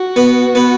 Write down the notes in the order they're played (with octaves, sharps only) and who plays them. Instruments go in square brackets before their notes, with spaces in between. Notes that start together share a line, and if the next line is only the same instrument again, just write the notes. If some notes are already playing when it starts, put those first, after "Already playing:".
Already playing: [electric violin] F#4
[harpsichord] B3
B3